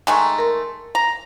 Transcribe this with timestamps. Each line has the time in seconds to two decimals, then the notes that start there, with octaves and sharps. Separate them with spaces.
0.07 D#3 G#3 A3 G#5 A#5 C#6
0.38 A#4 C6
0.95 A#5